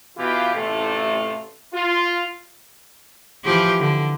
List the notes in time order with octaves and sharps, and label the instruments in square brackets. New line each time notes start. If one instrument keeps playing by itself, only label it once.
[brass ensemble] B2 E3 F4 G4
A1 C3 A3 F4
F4
[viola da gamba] E3 F3 G4
D3